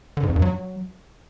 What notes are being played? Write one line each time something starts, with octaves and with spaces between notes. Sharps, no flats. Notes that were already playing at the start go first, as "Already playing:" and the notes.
D3
G#2
F2
G2
F#3